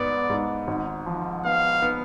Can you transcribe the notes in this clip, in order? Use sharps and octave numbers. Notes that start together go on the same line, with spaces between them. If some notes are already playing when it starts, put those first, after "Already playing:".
Already playing: G#2 B3 D5
G#2
G#1
F3
B3 F5
B3